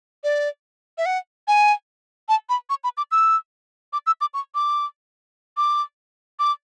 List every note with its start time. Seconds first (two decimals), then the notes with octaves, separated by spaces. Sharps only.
0.24 D5
0.98 E5
1.06 F#5
1.48 G#5
2.29 A5
2.49 B5
2.70 C#6
2.84 B5
2.97 D6
3.11 E6
3.93 D6
4.07 E6
4.21 D6
4.34 C#6
4.55 D6
5.57 D6
6.39 D6